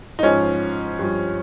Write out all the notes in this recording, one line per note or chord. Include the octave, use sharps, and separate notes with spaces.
D#4
G#2 F3 C#4
G2 F3